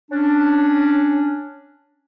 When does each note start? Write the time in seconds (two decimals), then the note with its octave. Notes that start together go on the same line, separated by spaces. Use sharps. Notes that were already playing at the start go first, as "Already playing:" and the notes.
0.10 C#4 D4